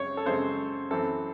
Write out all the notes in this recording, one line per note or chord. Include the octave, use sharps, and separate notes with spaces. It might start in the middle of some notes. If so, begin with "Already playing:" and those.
Already playing: F#2 C#3 G#3 C4 C#5
A4
F#2 C#3 G#3 C4 C5
F#2 E3 C4 A4